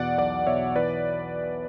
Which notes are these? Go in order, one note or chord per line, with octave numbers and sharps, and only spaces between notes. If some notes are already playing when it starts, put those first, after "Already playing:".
Already playing: E2 B2 D5 F#5
B1 D5 F#5
B2 C#5 E5
E3 B4 D5